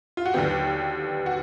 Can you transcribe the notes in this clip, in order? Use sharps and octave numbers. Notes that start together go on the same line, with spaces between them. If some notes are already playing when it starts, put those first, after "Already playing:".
F4
F#4
D#2 D3 F#3 B3 G4
F#4